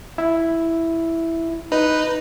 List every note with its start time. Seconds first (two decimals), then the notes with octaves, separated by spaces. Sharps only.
0.18 E4
1.72 D#4 B4